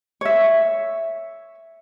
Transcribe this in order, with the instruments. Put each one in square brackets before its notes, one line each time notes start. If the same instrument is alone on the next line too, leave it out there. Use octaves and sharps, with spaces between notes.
[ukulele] C#5 E5